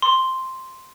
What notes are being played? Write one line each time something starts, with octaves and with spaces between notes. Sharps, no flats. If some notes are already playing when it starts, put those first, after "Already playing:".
C6